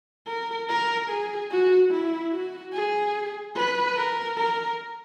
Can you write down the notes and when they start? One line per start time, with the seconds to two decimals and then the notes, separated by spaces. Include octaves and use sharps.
0.27 A#4
0.69 A#4
1.09 G#4
1.51 F#4
1.91 E4
2.32 F#4
2.73 G#4
3.56 B4
3.97 A#4
4.38 A#4